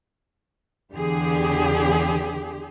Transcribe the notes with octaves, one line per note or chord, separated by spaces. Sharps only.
E2 D3 G4 G#4